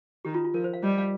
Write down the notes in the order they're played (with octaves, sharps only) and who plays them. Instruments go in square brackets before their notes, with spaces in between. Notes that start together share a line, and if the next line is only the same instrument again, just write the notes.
[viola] D#3 [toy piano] G4
[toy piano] F4
F4
[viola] F3 [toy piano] A#4
[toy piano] C5
F5
[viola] G3 [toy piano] D#5
[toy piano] F5